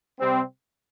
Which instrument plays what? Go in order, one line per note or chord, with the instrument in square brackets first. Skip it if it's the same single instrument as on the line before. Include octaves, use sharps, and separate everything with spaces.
[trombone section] C3 G3 C4